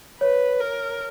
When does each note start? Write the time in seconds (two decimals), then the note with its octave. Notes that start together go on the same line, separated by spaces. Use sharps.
0.21 B4 C#5
0.60 A#4